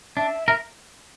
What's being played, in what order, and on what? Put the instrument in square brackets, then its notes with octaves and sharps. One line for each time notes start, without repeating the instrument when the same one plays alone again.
[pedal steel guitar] D4 [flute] E5
[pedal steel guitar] A#4 [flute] E5